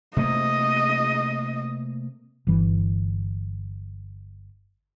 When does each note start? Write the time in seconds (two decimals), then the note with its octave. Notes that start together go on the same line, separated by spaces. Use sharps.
0.17 C3 A3 A#3 D#5
2.47 G1 E3